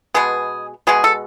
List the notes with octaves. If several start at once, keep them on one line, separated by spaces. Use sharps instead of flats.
B2 G#3 B3 G#4
B2 G#3 B3 G#4
A4